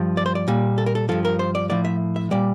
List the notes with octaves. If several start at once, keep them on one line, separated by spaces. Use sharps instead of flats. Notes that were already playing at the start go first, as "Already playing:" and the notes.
Already playing: G2 F3
D5
C5
D5
A#2 G3
A4
A#4
A4
G2 F3 A4
A#4
C5
D5
A2 F3 D5
E5
E5
A#2 G3 D5